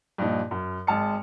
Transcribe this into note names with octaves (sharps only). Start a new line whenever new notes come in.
G2 A#2 F3 D#4
F#2
G#1 G#3 A5 F6 C#7